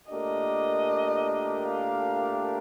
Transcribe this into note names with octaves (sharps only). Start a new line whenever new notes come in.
A#2 A3 D4 G4 A#4 D#5
F5